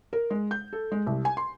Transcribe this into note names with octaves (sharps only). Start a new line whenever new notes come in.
A#4
G#3
G6
A4
G#3
C2
G#5
C6